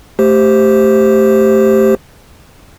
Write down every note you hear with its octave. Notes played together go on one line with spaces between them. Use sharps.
A3 G4 C5